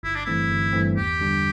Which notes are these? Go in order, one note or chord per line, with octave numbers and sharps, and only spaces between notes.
G1 E4
D4
G2 E3 A3 C4 E4
G1
G2 E3 A3 C4
E2 G4
D3 G3 D4